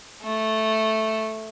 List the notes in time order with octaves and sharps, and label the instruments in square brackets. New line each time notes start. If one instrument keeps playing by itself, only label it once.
[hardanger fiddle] A3